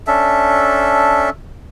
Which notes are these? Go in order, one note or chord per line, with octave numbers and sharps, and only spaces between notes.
C#4 D4 A4 E5